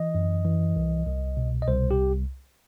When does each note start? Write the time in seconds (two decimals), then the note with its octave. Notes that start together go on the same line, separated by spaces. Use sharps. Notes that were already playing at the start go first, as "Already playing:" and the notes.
Already playing: E3 D#5
0.15 F#2
0.45 E3
0.76 C2
1.06 C2
1.37 B2
1.62 D#5
1.68 C2 C5
1.91 G4